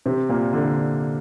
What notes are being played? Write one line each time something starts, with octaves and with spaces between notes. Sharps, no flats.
C3 C4
A#2 A#3
D3